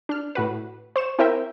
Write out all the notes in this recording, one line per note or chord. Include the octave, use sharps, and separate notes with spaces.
D4 F6
A2 F#4 B4
C5 C#6 E7
C4 E4 A#4 C5 E5 G5